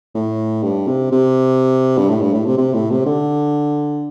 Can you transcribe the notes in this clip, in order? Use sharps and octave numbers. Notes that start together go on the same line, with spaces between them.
A2
G2
C3
C3
G2
A2
G2
A2
C3
C3
A2
C3
D3